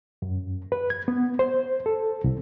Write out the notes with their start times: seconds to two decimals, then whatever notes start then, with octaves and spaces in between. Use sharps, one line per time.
0.22 F#2
0.72 B4
0.90 G#6
1.08 B3
1.39 C5
1.86 A4
2.24 C2